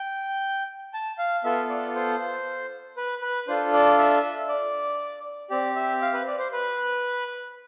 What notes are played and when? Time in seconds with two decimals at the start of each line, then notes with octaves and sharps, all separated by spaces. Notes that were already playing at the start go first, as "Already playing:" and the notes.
Already playing: G5
0.94 A5
1.18 F5
1.44 B3 F4 A4 E5
1.69 D5
1.95 C5
2.97 B4
3.22 B4
3.48 D4 F4 A4 C5
3.73 D5
3.99 E5
4.48 D5
5.50 C4 G4 D5
5.76 E5
6.02 F5
6.13 B4
6.27 D5
6.39 C5
6.53 B4